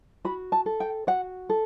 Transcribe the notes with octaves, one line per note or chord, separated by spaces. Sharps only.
F#4 B5
A5
A4
G5
F#4 F#5
A4